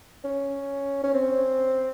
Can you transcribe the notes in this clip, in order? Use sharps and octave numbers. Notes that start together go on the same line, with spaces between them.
C#4
C#4
C4